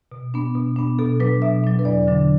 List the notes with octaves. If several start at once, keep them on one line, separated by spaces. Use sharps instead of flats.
B2
B3 D4
B2
B3 D4
B2 A4
F#3 D4 B4
B2 E5
F#3 D4
B4
E2 D5
D3 F#3 D4